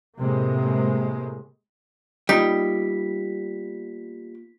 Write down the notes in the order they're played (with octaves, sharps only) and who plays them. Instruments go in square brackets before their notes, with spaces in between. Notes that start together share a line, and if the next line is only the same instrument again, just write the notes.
[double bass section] A2 C3 G#3 A#3
[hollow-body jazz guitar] G3 [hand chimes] A#3 B3 F4 [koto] D#4 [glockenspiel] B6